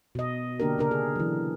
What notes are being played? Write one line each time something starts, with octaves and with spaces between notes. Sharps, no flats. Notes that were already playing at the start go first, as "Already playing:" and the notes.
B2 D#5
D3 A#3 D4 G4 A#4
C#3 D4 A#4
G#4
E3 F#3